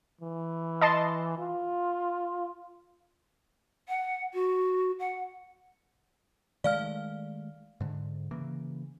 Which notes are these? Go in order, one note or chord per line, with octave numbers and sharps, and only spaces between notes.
E3
D#5 A5 C6
F4
F#5
F#4
F#5
D#3 G#3 A3 D5 F5 F6
G#2 D3
C#3 E3 A#3